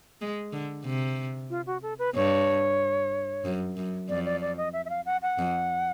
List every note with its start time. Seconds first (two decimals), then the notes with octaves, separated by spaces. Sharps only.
0.21 G#3
0.53 D3
0.85 C3
1.50 F4
1.66 F#4
1.82 A4
1.99 B4
2.15 G2 C#5
3.45 F#2
3.77 F#2
4.09 F2 D5
4.25 D5
4.41 D5
4.57 D#5
4.73 E5
4.85 E5
4.90 F5
5.06 F#5
5.22 F#5
5.38 F2